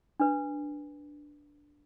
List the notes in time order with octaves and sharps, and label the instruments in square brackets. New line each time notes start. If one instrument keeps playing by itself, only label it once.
[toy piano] D4 B4